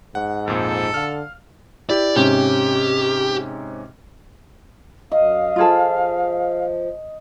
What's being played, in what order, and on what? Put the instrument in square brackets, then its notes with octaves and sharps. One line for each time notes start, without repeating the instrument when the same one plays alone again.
[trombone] G#2 [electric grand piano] F#5
[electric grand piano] F2 A#2 C5 [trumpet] A4
[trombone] D3 [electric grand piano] F5 F6
[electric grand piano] E4 G4 [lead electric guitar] D5
[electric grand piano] G#2 C3 C#4 [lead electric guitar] G4
[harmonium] F#2 [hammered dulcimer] D#5 [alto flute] F5
[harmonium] F3 [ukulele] F4 G#4 A4